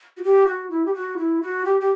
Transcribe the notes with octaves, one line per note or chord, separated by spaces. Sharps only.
F#4
G4
F#4
E4
G4
F#4
E4
F#4
G4
G4